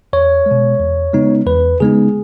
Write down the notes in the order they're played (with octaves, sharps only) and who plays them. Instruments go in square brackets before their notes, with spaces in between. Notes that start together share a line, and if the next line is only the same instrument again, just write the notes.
[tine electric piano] E2 C#5
G#3
B2
E2
C#3 G#3 B3 D#4
E2 B4
C#3 G#3 B3 D#4 G#4